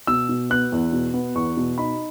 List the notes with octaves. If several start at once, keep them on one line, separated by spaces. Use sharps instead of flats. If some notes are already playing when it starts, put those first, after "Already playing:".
B2 E6
B2
B3 F#6
E2
B2
B3
E2 C#6
B2
D#4 B5